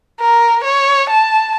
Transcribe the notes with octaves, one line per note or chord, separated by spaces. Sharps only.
A#4
C#5
A5